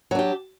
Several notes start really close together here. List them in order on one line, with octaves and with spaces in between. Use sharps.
F#3 D4 G4